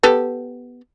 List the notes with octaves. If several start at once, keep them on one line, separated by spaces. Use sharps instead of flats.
B3 G4 A4